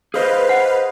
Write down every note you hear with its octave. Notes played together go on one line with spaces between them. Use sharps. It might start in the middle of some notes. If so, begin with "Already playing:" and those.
G#4 B4 C5 D#5 F5
F#5